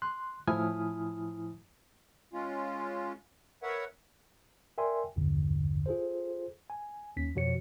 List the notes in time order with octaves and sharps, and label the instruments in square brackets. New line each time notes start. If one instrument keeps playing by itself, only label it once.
[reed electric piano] C6 F#6
A2 F3 E4 G#5 D#6 F6
[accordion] G#3 C#4 F4
A#4 B4 C#5 E5 F#5
[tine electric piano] A#4 D5 E5 G5 G#5 C6
B1 E2 G2 A#2 D3
F4 G#4 A4 C5
G#5
D#2 C#4 B6
F2 B2 F3 F#4 C#5 C#7